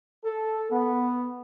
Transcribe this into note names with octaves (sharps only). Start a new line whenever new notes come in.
A4
B3